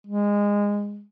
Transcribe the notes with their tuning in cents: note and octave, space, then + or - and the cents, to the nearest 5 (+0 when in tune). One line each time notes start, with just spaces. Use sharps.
G#3 -20